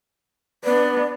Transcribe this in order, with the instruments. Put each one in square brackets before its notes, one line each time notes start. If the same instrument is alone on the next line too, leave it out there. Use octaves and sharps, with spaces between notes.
[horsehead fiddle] B3 D4 [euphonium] B4 [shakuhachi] D5